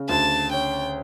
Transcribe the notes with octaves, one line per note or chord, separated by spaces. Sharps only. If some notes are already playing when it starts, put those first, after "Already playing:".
Already playing: C#3
D2 A5
C#4 G5